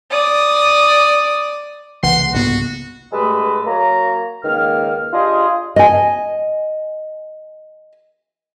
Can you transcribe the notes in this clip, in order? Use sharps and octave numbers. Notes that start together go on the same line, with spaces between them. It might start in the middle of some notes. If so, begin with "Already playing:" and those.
D5 D#6
C2 C#3 E3 A#3 F#5 C6
G1 G#2 B3 F#4
G2 G#3 A3 A4 B4 D#5
F#3 A#3 C#5 A#5
C#2 D#3 A#3 F6
D4 F4 G4 G#4 D#5
D#5 G#5